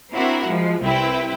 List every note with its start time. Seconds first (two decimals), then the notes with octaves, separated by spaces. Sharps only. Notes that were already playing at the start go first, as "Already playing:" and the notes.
0.14 C4 D4 E4 F#4 A#4
0.47 F3 G#3
0.83 C2 C4 E4 B4 G5